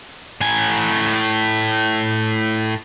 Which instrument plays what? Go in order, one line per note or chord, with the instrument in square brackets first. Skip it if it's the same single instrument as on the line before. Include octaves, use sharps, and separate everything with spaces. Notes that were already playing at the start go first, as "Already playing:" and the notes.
[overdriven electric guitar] A2 G#5